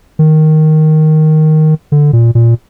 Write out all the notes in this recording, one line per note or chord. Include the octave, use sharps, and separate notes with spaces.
D#3
D3
A#2
A#2